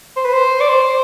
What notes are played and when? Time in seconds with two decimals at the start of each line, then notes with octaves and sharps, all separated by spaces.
0.17 C5
0.25 B4
0.33 C5
0.60 D5
0.69 C5